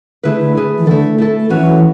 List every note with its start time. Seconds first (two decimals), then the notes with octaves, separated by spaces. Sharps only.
0.23 D3 A3 E4 G#4 B4
0.40 D3
0.55 A3 E4 G#4 B4
0.78 E3
0.86 D3 A3 E4 A4
1.18 A3 E4 A4
1.50 E3 F#3 C#4 F#4 B4